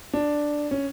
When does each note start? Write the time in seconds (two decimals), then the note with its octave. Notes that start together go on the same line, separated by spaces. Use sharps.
0.13 D4
0.71 C#4